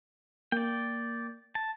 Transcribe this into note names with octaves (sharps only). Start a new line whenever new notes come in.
A#3 D5 G5
A5